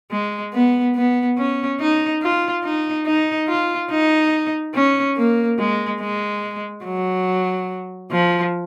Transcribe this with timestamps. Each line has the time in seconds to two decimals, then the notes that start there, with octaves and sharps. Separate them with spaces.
0.12 G#3
0.53 B3
0.95 B3
1.38 C#4
1.80 D#4
2.22 F4
2.64 D#4
3.06 D#4
3.48 F4
3.91 D#4
4.74 C#4
5.17 A#3
5.59 G#3
6.00 G#3
6.85 F#3
8.12 F3